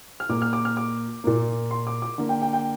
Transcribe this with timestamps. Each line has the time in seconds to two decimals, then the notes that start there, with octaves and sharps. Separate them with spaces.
0.20 F6
0.29 A#2 A#3 D6
0.42 F6
0.53 D6
0.65 F6
0.77 D6
1.24 A#2 A#3
1.71 C6
1.87 D6
2.02 D6
2.18 D3 A#3
2.29 G5
2.42 G5
2.53 G5